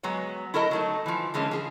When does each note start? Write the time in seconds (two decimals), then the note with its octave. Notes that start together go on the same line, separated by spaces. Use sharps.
0.03 F#3 G#3 B3 C#5
0.54 E4 F#4 A4 A#4 D#5
0.71 F#3 A3 D#4
1.06 E3 F3
1.34 D3 E3 G#3 A#3 C#4
1.51 F3 G#4